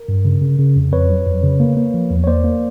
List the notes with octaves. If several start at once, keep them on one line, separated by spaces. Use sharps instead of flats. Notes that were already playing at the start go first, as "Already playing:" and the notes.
Already playing: A#4
G2
C#3
C#3
C#3
F2
F2 B4 C#5
F#3
F2
C#3
A#3
A#3
F3
E2
C#5
A#3 C5 D5
A#3